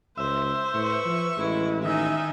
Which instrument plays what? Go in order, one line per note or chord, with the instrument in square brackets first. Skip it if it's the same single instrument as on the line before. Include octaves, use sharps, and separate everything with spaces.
[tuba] C#2 [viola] C5 [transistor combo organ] E5
[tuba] A2 [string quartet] B4 C#6
[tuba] F3
[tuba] A1 [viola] G#3 E4
[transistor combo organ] D#3 [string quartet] D#4 D#5 G#5 [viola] E5